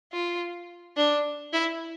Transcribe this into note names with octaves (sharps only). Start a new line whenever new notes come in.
F4
D4
E4